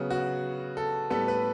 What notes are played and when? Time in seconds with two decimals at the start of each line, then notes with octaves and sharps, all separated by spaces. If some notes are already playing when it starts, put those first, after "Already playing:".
Already playing: C#3 F#3 B3
0.10 F#4
0.77 A4
1.10 A2 G3 B3 A4
1.28 B4